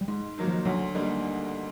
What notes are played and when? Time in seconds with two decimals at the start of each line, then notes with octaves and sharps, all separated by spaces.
0.01 G3
0.08 G#2 G#3
0.38 D#3 F#3 A#3 D#4
0.47 F3
0.65 D2 F#3
0.95 D3 G3 A#3 D#4